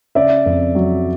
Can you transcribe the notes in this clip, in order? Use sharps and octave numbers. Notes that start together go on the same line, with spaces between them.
C#3 D5 E5
F2
F#3